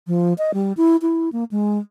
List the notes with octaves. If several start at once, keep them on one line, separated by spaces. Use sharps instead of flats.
F3
D#5
G3
E4
E4
A#3
G#3